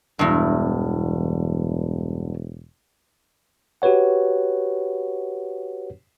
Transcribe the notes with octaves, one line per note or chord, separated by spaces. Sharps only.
E1 E2 G2
F#4 G4 B4 C#5 F#5